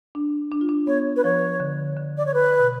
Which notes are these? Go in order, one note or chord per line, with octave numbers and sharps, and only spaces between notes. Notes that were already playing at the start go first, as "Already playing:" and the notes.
D4
D4
F4
D4
B3 C#5
B4
F3 C#5
D3
D3
D5
C#5
B4
B2